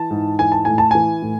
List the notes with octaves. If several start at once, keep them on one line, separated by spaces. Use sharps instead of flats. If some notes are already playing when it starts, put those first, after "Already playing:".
Already playing: E3 A5
G#2
E3 G#5
A5
A2 G#5
A5
E3 G#5
A2